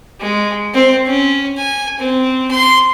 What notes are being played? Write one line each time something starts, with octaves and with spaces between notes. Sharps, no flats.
G#3
C4
C#4
G#5
C4
C6